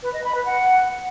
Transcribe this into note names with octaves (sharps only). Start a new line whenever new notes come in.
B4
D#5
B5
B4
F#5